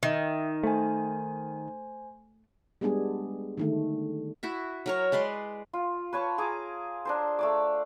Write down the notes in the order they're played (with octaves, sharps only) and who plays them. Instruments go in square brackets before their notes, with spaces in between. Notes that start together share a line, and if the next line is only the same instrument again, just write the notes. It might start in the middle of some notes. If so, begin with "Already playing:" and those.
[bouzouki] D#3 [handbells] D#5 E5
[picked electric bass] A3 [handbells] C5 G#5
[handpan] G3 G#3 B3 D4 G#4
D3 D#3 A3
[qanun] E4 F#4 E5
F#3 A#4 C#5
G#3 B4 D5 C6
[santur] F4
B4 C#5 A5 C#6
G#4 G#5 A#5 D6
D4 A#4 C5
A3 D5 D6